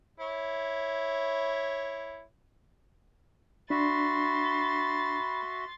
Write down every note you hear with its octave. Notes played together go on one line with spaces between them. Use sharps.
E4 C#5
D4 F#4 E5 B5 C6 A6